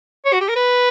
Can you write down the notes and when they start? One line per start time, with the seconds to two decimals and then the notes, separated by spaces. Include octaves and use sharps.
0.25 C#5
0.33 F#4
0.41 G4
0.49 A#4
0.56 B4